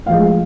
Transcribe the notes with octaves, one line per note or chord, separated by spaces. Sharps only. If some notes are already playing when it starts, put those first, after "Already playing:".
A2 F3 G#3 F5